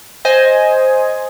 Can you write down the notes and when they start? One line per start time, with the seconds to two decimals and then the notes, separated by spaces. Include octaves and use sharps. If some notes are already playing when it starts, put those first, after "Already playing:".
0.25 C5 D#5 G#5